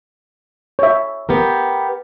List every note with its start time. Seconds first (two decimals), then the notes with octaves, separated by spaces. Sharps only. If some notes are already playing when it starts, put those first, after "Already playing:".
0.79 C#5 E5
1.29 B3 G4 A#4